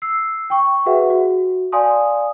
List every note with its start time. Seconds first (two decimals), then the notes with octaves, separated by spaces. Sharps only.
0.02 E6 C7
0.50 G5 C#6
0.86 F#4 G#4 B4 E5 F#5
1.10 F#4
1.72 D5 F5 G#5 A5 C6 D#6